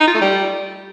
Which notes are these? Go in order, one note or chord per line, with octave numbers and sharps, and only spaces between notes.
D#4
F4
A3
G3